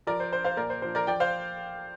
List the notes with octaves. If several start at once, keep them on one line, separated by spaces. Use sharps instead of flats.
F3 A#4 D5
C5
D4 C5
C5 F5
A#2 A#4 D5
C5
F3 D4 C5
A#4 D5
F3 D5 G5
C5 F5